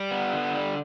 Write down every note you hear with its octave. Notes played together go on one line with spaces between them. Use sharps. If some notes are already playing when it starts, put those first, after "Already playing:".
Already playing: G3
B3
D3
G3